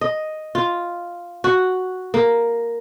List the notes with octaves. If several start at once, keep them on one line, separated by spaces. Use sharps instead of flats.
D#5
F4
F#4
A#3